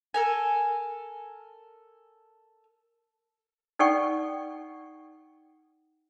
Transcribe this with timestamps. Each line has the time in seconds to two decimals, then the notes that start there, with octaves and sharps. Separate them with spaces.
0.14 A4 A#4 G#5
3.79 D#4 A4 D5 F#5 G5 C#6